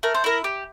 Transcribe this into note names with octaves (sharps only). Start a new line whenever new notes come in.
A3 A#4
C5
E4 A#4
G4